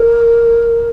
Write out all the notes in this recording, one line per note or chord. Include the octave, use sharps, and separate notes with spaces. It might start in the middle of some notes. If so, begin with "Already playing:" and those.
Already playing: A#4